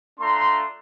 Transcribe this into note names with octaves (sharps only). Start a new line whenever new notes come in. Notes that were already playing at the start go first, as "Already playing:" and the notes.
A3 D4 F4 A#5 C6